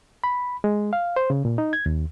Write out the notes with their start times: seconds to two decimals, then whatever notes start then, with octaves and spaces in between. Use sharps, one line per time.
0.24 B5
0.64 G#3
0.93 F5
1.16 C5
1.30 C#3
1.45 A#2
1.58 D#4
1.73 G#6
1.86 D#2